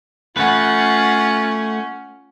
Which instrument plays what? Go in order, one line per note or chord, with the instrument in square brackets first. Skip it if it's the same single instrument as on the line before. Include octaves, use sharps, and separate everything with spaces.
[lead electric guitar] A3 B4 [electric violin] C#4 [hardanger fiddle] F4 F#5